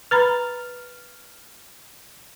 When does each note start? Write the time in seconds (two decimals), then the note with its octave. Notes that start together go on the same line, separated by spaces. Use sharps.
0.11 B4 A#5 B5 F6 A6